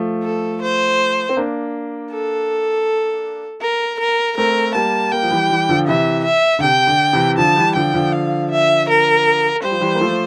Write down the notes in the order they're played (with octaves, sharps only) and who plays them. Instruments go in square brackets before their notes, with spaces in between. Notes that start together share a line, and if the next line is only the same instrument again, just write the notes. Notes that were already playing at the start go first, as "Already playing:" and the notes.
Already playing: [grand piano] F3 A3
[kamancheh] A4
C5
[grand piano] C4
A#3 D4
[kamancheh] A4
A#4
A#4
[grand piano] A3 C4 [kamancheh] A#4
[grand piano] G3 A#3 [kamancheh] A5
[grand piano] G3 A#3 [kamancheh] G5
[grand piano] F3
E3 G3
E3 G3
D3 F3
[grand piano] C3 E3 [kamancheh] E5
[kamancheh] E5
[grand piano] D3
[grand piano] C3 [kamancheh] G5
[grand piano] D3
C3 E3
[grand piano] D3 F3 [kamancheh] A5
[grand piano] E3 G3
[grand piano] D3 F3 [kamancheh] G5
[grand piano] D3 F3
[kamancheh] F5
E5
A#4
[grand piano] G3 [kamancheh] C5
[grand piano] F3
E3 G3
A#3
F3 A3